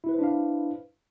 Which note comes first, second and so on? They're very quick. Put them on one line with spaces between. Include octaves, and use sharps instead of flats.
E4 B4 C5 D4 F5